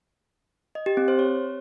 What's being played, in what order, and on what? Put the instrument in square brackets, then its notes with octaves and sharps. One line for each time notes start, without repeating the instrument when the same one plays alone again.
[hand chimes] D#5
G4
C4
C5
C#5